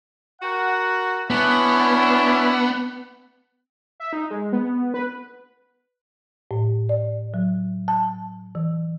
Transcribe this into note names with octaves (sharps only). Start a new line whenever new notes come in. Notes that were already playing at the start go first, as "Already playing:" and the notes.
F#4 A#4 F#5
B3 C#4 D4 E4
E5
D#4
G#3
B3
B4
A2
D5
F#3
A5
E3